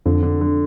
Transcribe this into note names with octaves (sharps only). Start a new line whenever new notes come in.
F2 D3
D3
D3